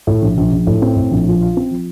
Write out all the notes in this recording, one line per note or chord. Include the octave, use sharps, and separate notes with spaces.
A2
A#1
A#1
A#1
A2
C4
A2
A#1
F3
F4
C4
F3